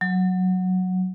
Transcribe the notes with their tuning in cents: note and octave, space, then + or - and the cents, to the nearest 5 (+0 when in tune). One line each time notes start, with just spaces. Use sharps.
F#3 -5